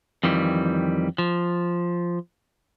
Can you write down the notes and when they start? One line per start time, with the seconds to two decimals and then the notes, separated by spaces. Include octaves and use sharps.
0.23 F2 D#3 E3 G3
1.18 F3